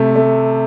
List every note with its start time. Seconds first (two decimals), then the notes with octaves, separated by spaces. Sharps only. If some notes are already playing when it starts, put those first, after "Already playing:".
Already playing: C3 A3
0.16 A3